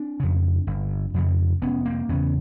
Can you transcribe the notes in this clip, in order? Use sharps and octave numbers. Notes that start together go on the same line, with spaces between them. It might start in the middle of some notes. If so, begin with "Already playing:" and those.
Already playing: C4 D4
F2 C#3
G1
F2 C#3
F1 B3 C#4
A#3 C4
E2 C#3 B3 C#4